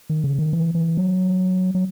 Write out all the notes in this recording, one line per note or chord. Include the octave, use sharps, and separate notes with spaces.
D#3
C#3
D#3
E3
E3
F#3
F#3